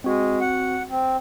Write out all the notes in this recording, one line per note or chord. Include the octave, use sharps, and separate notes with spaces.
G#3 C4 F#4
F#5
C4